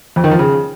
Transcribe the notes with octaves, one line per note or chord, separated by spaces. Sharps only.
F2
D#3
F3
C#3